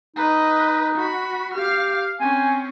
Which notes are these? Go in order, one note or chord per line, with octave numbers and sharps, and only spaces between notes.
D#4 B4 D#5
F#4 B5
G4 F5 F6
C4 C#4 G#5